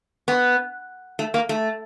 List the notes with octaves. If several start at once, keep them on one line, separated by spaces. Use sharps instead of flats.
B3
A3
A#3
A3